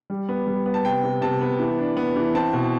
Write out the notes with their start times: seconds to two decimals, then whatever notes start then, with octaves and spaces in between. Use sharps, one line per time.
0.10 G3
0.29 B3
0.47 G3
0.66 B3
0.74 A5
0.84 C3 G5
1.03 C3
1.22 C3 A5
1.41 B3
1.59 E3
1.79 D4
1.97 B3
2.16 E3
2.34 C4 A5
2.53 B2